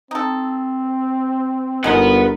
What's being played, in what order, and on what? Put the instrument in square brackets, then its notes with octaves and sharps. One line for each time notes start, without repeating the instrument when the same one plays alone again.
[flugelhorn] C4 [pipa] D#4 A4
[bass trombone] G1 [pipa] G#3 D#4 F4 [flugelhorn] A#4 [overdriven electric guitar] B4 F#5